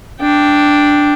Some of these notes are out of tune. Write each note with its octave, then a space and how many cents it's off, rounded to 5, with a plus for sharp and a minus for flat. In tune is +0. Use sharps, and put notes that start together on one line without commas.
D4 +0 G5 +0